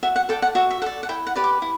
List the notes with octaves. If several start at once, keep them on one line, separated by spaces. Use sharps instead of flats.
F#4 E5
F#5
A4 D5 G5
F#5
F#4 E5
E5
A4 D5 F#5
F#5
E4 G5
F#5
G4 B4 D5
D6
E4